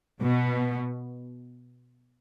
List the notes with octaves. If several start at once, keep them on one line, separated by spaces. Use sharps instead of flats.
B2